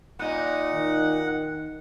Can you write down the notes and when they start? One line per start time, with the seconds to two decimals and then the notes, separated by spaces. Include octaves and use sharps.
0.19 A#2 D#4 F#5
0.74 D#3